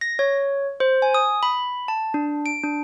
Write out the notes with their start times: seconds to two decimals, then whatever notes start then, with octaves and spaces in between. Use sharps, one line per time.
0.01 A#6
0.19 C#5
0.80 C5
1.02 G#5
1.14 D#6
1.43 B5
1.88 A5
2.14 D4
2.46 D7
2.64 D4